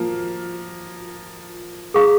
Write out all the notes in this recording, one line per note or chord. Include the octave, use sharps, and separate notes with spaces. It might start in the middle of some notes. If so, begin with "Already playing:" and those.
Already playing: F3 A#3
G#4 F5 A#5 C#6